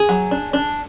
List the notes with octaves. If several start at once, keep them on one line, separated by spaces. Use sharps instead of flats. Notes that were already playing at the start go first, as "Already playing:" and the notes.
Already playing: G#4
F#3
D4
D4